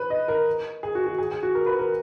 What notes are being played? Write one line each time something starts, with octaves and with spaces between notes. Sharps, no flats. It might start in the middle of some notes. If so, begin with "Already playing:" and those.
Already playing: B4
D#5
A#4
G#4
F#4
F#4
G#4
G#4
F#4
A#4
B4
A#4